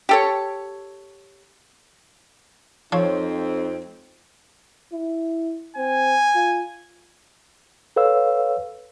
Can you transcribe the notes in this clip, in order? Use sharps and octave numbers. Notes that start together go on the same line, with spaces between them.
G4 A4 C#5
F2 F3 C4 D#4 C#5
E4
C4 G#5
F4
A4 B4 C#5 F5 E6